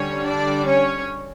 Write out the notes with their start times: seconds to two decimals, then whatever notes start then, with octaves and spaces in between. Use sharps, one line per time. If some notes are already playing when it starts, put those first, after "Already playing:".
Already playing: D3 G3 C#4 C#5
0.27 D4 D5
0.66 C#4 C#5